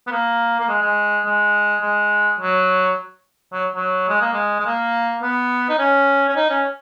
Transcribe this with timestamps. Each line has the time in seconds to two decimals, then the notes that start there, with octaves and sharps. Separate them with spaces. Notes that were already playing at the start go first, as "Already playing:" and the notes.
0.07 B3
0.11 A#3
0.60 A#3
0.69 G#3
0.82 G#3
1.25 G#3
1.81 G#3
2.39 F#3
3.53 F#3
3.75 F#3
4.09 G#3
4.21 A#3
4.33 G#3
4.60 G#3
4.66 A#3
5.23 B3
5.69 D#4
5.79 C#4
6.29 C#4
6.36 D#4
6.50 C#4